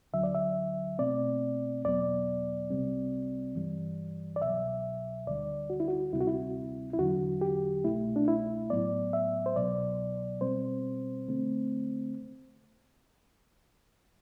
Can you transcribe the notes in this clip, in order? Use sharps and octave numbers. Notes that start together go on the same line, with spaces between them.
D2 D3 F#3 E5
D5
E5
B2 A3 C4 D5
E2 B2 F#3 B3 D5
C2 C3 G3 C4
G2 E3 G3
D5
C2 B2 F#3 E5
D2 D3 G3 D5
F#4
E4
F#4
D2 C3 G3 C4 E4
F#4
E4
E4
E2 D3 F#3 F#4
G4
C2 B2 A3 E4
D4
E4
A2 F#3 B3 D5
E5
C5
C2 B2 F#3 B3 D5
B2 G3 C4 C5
D3 A3 C4